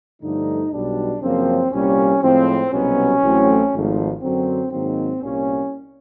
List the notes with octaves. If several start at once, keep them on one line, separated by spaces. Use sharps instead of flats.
G2 D3 F3 A3 D#4
B1 B2 G3 D4
F#2 C#3 F3 A#3 C4
C2 A#2 G3 A#3 C#4
A2 F3 G#3 C4
C2 B2 F#3 B3 C#4
A1 A2 F#3 A3 C4
G#1 G#2 F3 A3
F#2 D3 F#3 C4
G#2 D#3 F#3 A#3 C4
C2 A#2 G3 A#3 C#4